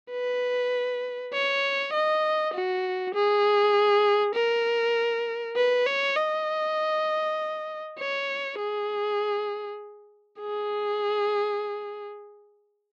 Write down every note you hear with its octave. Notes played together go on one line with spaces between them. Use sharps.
B4
C#5
D#5
F#4
G#4
A#4
B4
C#5
D#5
C#5
G#4
G#4